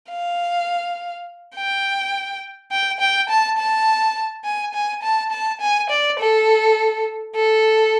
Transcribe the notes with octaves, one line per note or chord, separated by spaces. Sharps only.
F5
G5
G5
G5
A5
A5
G#5
G#5
A5
A5
G#5
D5
A4
A4